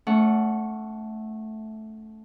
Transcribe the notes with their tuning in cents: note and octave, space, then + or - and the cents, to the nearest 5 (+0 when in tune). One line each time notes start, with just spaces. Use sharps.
A3 -10 C#4 +35 F#5 +0